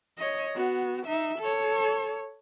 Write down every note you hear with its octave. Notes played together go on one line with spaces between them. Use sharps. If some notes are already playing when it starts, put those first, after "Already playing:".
C#5 D#5
B3 F#4
D#4 E5
A4 C#5